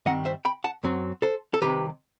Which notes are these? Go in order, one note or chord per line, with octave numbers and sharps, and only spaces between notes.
G2 D#3 G3 C4 D#5 F#5
C5 E5
G5 B5
F#5 A5
F#2 F#3 C4
A4 C5
A4
C2 C3 D#3 G4 B4